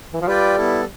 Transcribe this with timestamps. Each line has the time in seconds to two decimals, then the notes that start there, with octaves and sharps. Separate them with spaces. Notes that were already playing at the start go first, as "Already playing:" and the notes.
0.13 E3
0.21 F3
0.28 G3 F4 B4 D5 G5
0.57 B3 E4 A4